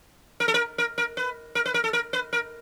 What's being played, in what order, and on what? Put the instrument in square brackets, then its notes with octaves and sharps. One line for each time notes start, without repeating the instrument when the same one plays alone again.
[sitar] A#4
A4
A#4
A#4
A#4
B4
A#4
B4
A#4
A4
A#4
B4
A#4